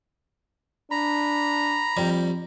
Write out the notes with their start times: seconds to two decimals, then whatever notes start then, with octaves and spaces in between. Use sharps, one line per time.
0.91 D4 A#5 B5
1.97 F2 G3